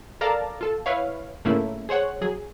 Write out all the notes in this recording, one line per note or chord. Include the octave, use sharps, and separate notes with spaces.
A4 A#4 D5 F5 A5 A#5
F4 A4
E4 B4 C#5 F5
G#2 C#3 A3 A#3 C#4 E4
G#4 C5 C#5 F#5
F#3 G#4